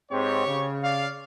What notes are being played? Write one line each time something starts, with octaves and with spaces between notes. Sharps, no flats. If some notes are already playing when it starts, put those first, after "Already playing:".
G#2 C4 G4 C#5 C#6
C#3
D5 F5